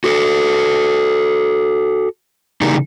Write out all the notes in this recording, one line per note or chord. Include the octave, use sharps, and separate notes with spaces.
F#4 A4
C#3 E3 G3 A#3 D#4